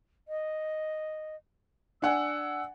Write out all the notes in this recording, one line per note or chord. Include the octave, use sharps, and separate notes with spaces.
D#5
D4 F#5 G#5 E6